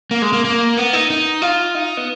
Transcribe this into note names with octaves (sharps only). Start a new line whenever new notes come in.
A#3
G#3
A#3
A#3
B3
D#4
D#4
F4
D#4
B3